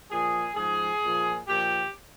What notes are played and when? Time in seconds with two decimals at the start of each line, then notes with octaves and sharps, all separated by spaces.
0.10 A#2 F3 G#4
0.56 G#2 F3 G#4
1.02 A#2 F3
1.47 A#2 F3 G4